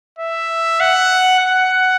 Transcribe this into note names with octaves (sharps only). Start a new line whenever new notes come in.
E5
F#5
F#5